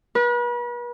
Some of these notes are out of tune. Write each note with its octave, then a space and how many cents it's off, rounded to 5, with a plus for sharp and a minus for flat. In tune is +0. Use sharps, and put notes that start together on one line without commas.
B4 -40